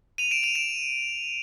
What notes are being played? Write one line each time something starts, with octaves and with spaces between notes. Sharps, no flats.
D#7 F7
D7 E7
D#7 F7
D7 E7